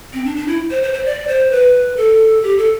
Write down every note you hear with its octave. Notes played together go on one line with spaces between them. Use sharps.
C4
D4
D4
E4
C5
C5
C5
D5
C5
B4
A4
G4
A4